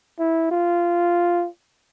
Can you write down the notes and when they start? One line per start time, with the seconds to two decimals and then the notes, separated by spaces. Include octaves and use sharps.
0.19 E4
0.51 F4